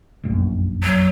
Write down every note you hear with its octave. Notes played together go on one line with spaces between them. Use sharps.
F1 A#1 F#2
F#3